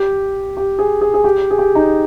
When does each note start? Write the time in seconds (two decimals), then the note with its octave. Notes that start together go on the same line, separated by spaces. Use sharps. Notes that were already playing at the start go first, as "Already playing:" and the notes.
Already playing: G4
0.57 G4
0.79 G#4
1.01 G#4
1.14 G#4
1.24 G4
1.51 G#4
1.58 G4
1.75 D#4